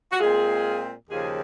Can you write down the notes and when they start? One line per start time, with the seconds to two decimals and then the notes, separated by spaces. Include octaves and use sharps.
0.13 F#4
0.20 A#2 G#3 C4 F4 G#4
1.10 D#2 C#3 F3 F4 G#4